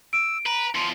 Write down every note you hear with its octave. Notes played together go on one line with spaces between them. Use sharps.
E6 D7
B4 A#5
E2 F3 C6